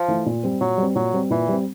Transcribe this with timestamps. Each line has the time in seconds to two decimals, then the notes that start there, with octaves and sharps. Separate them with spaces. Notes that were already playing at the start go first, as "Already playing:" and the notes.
Already playing: F3
0.08 E3 A3
0.26 A#2
0.43 G3 C4
0.61 A#2 F#3
0.78 G3 C4
0.95 A#2 F#3
1.13 G3 C4
1.30 A#2 E3
1.48 G3 C4